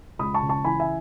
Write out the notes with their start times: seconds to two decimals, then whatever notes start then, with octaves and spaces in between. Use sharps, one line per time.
0.19 C#2 B5 D#6
0.34 A5 C#6
0.42 C#3
0.49 A5 C#6
0.64 E3 G#5 B5
0.80 E5 G#5